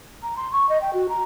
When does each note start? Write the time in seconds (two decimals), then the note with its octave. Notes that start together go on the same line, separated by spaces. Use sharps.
0.22 A#5
0.36 C6
0.52 C#6
0.68 D#5
0.81 G5
0.93 F#4
1.09 A#5